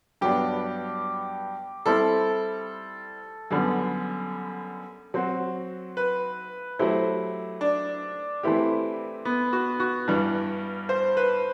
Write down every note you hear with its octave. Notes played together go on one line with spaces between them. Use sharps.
G2 F#3 B3 D4 G4
G3 C4 E4 A4
F#2 D3 G3 B3
F#3 C4 F#4
B4
F#3 A3 E4 G4 C5
D4
E3 A3 C4 E4 G4
B3
F#4
F#4
G2 E3 G3
C5
B4